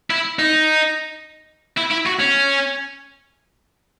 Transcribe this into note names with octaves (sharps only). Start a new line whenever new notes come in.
E4
D#4
E4
E4
F#4
C#4